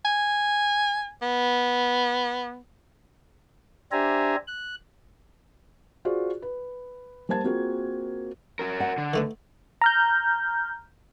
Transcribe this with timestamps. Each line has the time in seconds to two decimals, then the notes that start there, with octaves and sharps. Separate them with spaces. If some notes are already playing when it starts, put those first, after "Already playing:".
0.05 G#5
1.22 B3
3.92 D4 G4 C5 E5 G#5 A#5
4.47 F#6
6.05 F4 F#4 G#4 C5 D5
6.42 B4
7.29 G3 A#3 C5 A5 G#6
7.44 A#3 C4 F4 F#4 G#4 A#4
8.59 F#4 A#4
8.80 F#5
8.98 D3
9.14 D#3 A3 B3
9.82 A#5 F6 G6